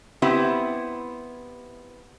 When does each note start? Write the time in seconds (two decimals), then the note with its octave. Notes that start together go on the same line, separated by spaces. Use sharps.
0.22 B3 C4 E4 G4